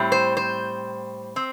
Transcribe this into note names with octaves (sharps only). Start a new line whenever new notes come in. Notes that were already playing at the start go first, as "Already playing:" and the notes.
Already playing: A2 G3 C4
C5
C5
C4